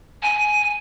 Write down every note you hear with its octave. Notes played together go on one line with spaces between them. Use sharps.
G#5